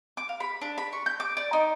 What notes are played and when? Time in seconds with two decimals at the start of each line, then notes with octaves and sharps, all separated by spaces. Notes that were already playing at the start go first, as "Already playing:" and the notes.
0.17 D6
0.29 F5
0.40 B5
0.62 D4
0.78 B5
0.93 C#6
1.06 G6
1.20 D6
1.37 D5
1.53 D#4